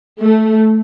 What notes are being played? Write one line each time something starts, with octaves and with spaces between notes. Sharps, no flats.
A3